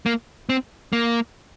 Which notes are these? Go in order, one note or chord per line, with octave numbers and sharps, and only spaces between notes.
A#3
C4
A#3